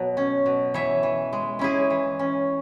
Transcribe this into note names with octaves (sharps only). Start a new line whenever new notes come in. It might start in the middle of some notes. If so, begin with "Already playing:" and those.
Already playing: B2 F#3
C#4
B2
E3 C#5 E5
E3
G#3
C#4 E4 G#4
E3
C#4